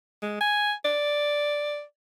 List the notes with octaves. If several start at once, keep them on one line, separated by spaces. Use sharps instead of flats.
G#3
G#5
D5